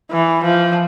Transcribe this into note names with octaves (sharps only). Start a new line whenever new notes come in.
E3
F3